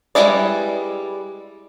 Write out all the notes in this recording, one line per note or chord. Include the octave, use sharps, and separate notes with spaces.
G3 G#3 E4 B4 D5